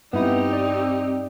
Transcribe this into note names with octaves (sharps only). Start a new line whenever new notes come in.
G2 B3 C4 D#4 E4 G4
D5